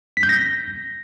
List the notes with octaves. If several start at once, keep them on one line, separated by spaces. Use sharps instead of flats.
B6
G6
A#6